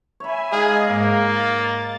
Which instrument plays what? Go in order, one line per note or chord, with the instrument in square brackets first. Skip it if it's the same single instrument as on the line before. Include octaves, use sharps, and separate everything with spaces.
[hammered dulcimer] C#5 B5 [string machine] E5 G#5
[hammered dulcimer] G#3 D#4 F5 [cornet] G#4 [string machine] D#5
[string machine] G#2 [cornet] A#3
[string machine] A6
[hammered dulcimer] D5